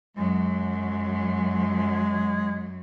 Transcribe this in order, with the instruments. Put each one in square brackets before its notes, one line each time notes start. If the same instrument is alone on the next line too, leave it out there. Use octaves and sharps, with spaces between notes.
[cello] F#2 F#3 [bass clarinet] G#3